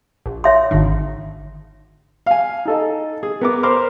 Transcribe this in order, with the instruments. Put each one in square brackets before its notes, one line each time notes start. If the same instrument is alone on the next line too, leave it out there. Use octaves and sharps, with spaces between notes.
[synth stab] A#1
[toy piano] C#5 E5 C6
[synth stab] G#1 D3 D#3
[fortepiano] F5 G#5
D#4 A4 D#5
G#4
B3 A#4 D6
A#4 C5 B5 C6 D6 F6